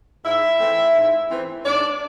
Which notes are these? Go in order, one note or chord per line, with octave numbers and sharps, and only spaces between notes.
G#2 E4 E5
E3 A3 C4
G#2
E3 A3 C4
G#2 D4 D5